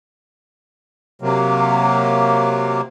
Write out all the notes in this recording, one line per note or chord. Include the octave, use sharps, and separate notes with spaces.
C3 F#3 A#3